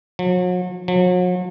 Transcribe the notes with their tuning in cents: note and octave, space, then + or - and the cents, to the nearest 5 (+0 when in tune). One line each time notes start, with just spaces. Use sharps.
F#3 -40
F#3 -40